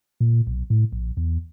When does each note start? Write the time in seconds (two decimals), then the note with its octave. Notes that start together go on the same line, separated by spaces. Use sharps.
0.20 A#2
0.47 B1
0.70 A2
0.92 A#1
1.17 E2